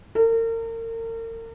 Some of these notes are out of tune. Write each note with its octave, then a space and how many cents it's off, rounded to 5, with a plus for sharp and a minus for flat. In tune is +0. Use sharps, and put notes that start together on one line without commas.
A#4 -40